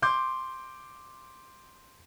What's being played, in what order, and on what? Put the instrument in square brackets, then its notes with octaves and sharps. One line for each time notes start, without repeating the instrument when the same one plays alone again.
[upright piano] C6 D6 G6